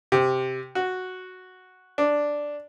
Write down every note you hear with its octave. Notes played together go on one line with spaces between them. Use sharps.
C3
F#4
D4